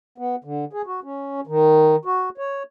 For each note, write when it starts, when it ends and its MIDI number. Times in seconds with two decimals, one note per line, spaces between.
0.18 0.36 59
0.44 0.65 50
0.73 0.82 68
0.86 1.00 66
1.04 1.41 61
1.47 1.96 51
2.05 2.29 66
2.38 2.63 73